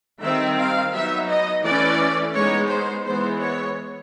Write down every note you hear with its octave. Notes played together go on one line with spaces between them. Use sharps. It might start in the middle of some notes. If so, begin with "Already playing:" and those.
D#3 G3 C4 D#4 E5
F5
F#3 B3 D#4 E5
D#5
E3 A3 C#4 D5
G#3 B3 D#4 C#5
C5
E3 G#3 B3 C5
C#5